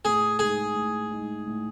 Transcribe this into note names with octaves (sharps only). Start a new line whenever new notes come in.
A2 G#4
G#3 D#4 G#4
A2
G#3 D#4
A2